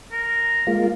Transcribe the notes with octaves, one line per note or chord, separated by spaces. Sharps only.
A#4
G#3 A#3 F4